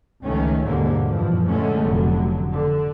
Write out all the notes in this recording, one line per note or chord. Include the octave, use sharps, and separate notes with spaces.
C#2 D#3 A3 C#4
D#2 G#2 B2 D3 G3 A#3
F#2 A#2 E3 F3
A2 D3 G#3 A3 C#4
F1 A2 D3 F#3
D3